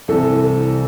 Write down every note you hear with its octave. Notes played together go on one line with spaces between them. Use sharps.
C2 C3 E3 A4